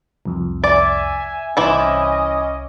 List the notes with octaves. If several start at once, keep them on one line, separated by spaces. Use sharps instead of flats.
C2 F2
D5 E5 G#5
C2 E3 C#4 E4 C5 D#5 D6